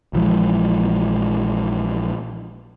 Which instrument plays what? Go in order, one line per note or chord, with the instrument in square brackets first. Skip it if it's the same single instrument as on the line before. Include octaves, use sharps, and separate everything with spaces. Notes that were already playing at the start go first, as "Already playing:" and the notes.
[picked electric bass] A#1 E3 F3 G#3